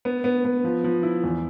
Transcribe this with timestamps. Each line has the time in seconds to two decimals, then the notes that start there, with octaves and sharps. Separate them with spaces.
0.05 B3
0.24 B3
0.45 B3
0.64 F3
0.84 F3
1.03 E4
1.23 E2